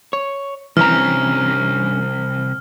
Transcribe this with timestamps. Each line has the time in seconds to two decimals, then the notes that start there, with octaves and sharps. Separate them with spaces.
0.13 C#5
0.77 C2 G2 E3 C4 C#4 A#5 F6